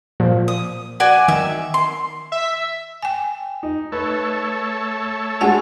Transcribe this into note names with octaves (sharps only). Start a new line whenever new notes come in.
A#2 F3
D#6
F#4 D5 G#5
D#3 E5
C6
E5
G5 G#5
D#4
A3 A4 B4 C#5
G#3 D4 F#4 F#5 G#5 A5